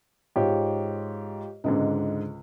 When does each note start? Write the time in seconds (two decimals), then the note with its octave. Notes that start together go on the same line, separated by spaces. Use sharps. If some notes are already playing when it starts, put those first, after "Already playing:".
0.36 G#2 F4 G4 C#5
1.64 C#2 G#2 D3 D#5